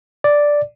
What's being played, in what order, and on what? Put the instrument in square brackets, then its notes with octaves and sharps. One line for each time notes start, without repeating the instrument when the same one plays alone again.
[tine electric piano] D5